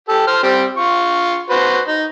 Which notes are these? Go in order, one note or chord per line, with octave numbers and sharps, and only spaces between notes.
G4 A4
C5 F6
G3 C4
F4 C#6
F#4 B4 C5
D#4